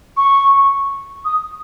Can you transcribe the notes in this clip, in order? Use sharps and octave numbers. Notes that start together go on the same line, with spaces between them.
C#6
D#6